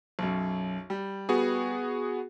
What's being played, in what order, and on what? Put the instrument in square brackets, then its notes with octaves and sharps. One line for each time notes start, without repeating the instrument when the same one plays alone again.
[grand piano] B1 F#2
G3
[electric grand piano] B3 F#4 G#4